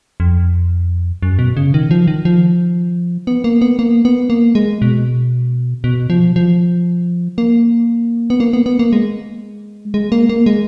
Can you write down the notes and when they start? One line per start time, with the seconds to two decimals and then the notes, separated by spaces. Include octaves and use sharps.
0.20 F2
1.23 F#2
1.39 B2
1.57 C#3
1.74 D#3
1.91 F3
2.08 D#3
2.25 F3
3.27 B3
3.44 A#3
3.62 B3
3.79 A#3
4.05 B3
4.30 A#3
4.55 G#3
4.82 B2
5.84 B2
6.10 F3
6.36 F3
7.38 A#3
8.30 B3
8.40 A#3
8.53 B3
8.66 B3
8.79 A#3
8.93 G#3
9.94 G#3
10.12 A#3
10.29 A#3
10.46 G#3